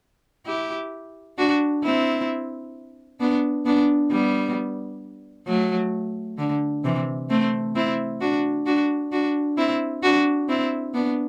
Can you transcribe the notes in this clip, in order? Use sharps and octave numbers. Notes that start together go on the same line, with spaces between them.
E4 G4
D4 F#4
C4 E4
B3 D4
B3 D4
G3 B3
F#3 A3
D3
C3 E3
A3 C4
C4 E4
D4 F#4
D4 F#4
D4 F#4
C4 E4
D4 F#4
C4 E4
B3 D4